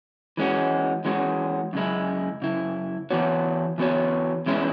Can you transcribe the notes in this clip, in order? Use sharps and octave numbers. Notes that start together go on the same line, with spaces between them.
E3 G#3 C#4 F#4
E3 G#3 C#4 F#4
F#2 C#3 G#3 E4
F#2 C#3 E4
E3 B3 F#4 C#5
E3 B3 F#4 C#5
E2 E3 G#3 C#4 E4